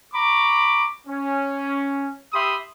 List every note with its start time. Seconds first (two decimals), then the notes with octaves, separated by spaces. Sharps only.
0.14 A#5 B5 C#6 D6
1.07 C#4
2.33 G4 E5 B5 C6 D#6